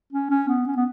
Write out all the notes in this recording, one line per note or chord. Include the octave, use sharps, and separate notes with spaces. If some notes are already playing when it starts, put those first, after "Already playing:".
C#4
C#4
B3
C#4
B3